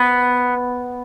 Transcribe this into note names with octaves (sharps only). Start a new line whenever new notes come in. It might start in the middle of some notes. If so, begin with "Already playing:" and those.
Already playing: B3